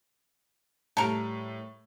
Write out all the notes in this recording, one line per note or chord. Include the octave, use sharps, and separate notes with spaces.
A2 G3 A4 A#4